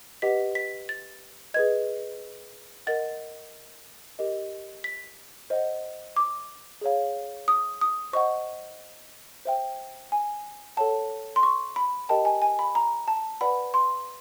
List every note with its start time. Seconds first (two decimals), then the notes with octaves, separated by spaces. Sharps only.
0.22 G4 B4 D#5 F#5 B6
0.55 B6
0.89 A6
1.54 G#4 B4 D#5 G#6
2.87 A#4 D#5 F#5 A6
4.19 G4 A#4 D#5
4.84 B6
5.50 C5 D#5 F#5
6.16 D6
6.81 G#4 C#5 F5
7.48 D#6
7.81 D#6
8.13 C5 D#5 F#5 C#6
9.45 C5 E5 G5
10.12 G#5
10.77 A4 C#5 F#5 A5
11.36 C6
11.43 C#6
11.76 B5
12.09 G4 A#4 D#5 G5 A5
12.25 G#5
12.42 G#5
12.59 B5
12.75 A#5
13.08 A5
13.41 B4 D5 F#5 B5
13.74 C6